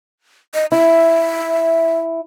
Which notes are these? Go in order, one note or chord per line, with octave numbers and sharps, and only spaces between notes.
D#5
E4 E5